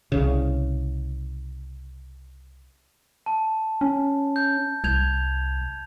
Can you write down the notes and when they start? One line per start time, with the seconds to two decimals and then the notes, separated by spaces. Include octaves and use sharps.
0.12 C2 C#3
3.26 A5
3.81 C#4
4.36 G6
4.84 C2 G6 G#6 F7